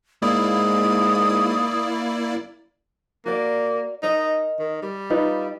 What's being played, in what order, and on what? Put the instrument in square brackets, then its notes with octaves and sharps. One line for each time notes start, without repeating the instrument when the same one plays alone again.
[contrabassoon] G#2 [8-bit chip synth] A#3 E4 D5 [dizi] D#6
[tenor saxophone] A#3 [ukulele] F#4 D5
[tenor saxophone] D#4 [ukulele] A#4 D#5
[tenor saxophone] D#3
G3
[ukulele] D#4 F4 B4